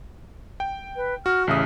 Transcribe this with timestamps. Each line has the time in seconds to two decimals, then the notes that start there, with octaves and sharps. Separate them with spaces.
0.60 G5
0.96 B4
1.26 F#4 F6
1.47 A1 C#3 E5 D#6